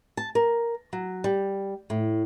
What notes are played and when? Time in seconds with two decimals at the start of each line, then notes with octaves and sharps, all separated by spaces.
0.17 A5
0.35 A#4
0.93 F#3
1.24 G3
1.90 A2